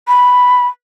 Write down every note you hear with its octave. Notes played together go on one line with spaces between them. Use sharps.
B5